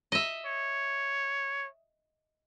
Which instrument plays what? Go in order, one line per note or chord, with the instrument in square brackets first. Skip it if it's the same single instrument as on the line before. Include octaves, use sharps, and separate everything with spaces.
[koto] D#5 E5
[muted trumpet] C#5